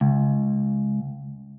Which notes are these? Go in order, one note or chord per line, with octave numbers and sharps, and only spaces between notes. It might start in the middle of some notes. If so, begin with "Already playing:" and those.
C#2